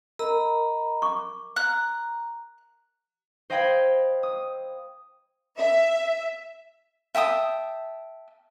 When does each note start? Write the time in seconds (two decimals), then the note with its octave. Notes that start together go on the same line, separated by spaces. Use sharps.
0.19 A#4 D#5 A#5 B5
1.02 C#6 D6
1.56 A#5 F#6
3.50 C5 D#5 F5 G5 B5 G#6
4.23 D#6
5.57 E5
7.15 E5 G5 A5 D#6